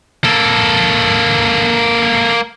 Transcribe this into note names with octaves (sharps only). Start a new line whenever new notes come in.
A#3 A4